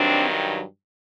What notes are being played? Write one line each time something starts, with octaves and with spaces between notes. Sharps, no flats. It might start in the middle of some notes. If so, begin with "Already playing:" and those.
Already playing: G2 D#3 F#3 C4 D4